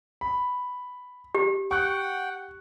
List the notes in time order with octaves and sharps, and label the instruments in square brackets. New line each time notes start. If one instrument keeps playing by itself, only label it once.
[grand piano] B5
[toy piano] G4
[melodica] F#5 G5 [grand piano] C#6 F#6